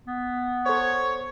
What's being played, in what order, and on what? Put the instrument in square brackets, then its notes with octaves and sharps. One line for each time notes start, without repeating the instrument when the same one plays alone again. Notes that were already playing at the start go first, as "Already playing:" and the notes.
[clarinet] B3
[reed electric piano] A4 C5 [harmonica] C#5